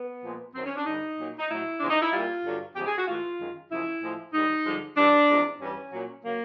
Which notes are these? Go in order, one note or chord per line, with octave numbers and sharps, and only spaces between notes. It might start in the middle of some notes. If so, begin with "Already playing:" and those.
Already playing: B3
A#2 F3 G#3
F#2 D#3 F#3 C4
C#4
D4
G2 D3 G3 D#4
A#2 F#3
D#4
A2 F#3 E4
E2 C#3 F3 G#3 D4
D#4
E4
A#2 G3 F4
G2 D3 F#3
E2 C#3 F3 G#3 G4
G#4
F#4
A2 E3 G#3 F4
F#2 D#3 G#3
F#2 C#3 F3 G#3 E4
A2 F3 G#3
G#2 D#3 G3 D#4
G2 D3 F3 G#3
G2 E3 G3 D4
E2 C3 F3 G#3
G2 E3 G3 C#4
A#2 F#3
C#3 F#3 A#3